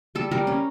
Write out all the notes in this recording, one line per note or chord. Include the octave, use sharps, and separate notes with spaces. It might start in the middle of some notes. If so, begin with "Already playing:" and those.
G3 A4
G3 A#4
C#4